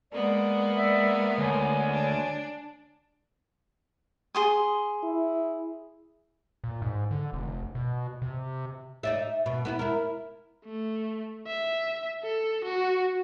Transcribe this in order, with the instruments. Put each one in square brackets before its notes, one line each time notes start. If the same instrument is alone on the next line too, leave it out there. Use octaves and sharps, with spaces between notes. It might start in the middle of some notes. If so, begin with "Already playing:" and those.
[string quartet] G#3 A#3 B3 [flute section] D5
[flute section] D5 E5
[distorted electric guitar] D2 [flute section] C#5 G#5
[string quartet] D4
[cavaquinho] G#4 C6 D#6
[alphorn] E4
[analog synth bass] A#2
G#2
D3
F1
B2
C3
[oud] D#4 D5 E5
B2
B3 D#4 E4
E4 A#4
[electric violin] A3
E5
A4
F#4